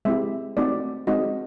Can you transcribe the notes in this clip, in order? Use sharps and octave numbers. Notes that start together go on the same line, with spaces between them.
G#3 C4 E4 G4 E5
A3 C4 D#4 F#4 D5
G#3 C4 D#4 F#4 D#5